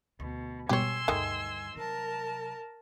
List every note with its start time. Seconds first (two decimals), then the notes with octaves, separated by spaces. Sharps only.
0.20 D2 B2
0.69 G#2 B2 G3 G4 C#5 G#5 C6 E6
1.08 D2 G2 D#3 G#3 A3
1.76 C3 F#3 A#4 A5